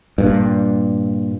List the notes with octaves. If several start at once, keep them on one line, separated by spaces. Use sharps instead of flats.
G2 A#2